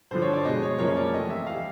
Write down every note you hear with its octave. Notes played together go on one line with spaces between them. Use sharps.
G2 D3 F3 C5
C#5
D5
B2 G#3 D#5
C#5
F#2 C#3 F3 A#3 C#5
D5
C3 E3 A3 D#5
E5
E3 G3 F5